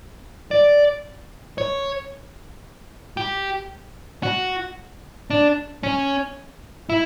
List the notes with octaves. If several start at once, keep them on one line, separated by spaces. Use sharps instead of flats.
D5
C#5
G4
F#4
D4
C#4
E4